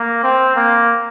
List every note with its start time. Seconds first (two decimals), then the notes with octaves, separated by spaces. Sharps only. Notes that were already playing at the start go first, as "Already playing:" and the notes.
Already playing: A#3
0.23 C4
0.56 A#3